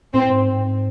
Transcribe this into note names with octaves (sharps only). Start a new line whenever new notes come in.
A2 C4
G#2